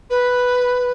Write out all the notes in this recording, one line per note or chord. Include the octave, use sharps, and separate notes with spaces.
B4